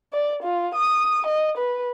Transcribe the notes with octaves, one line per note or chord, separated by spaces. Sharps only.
D5
F4
D#6
D#5
B4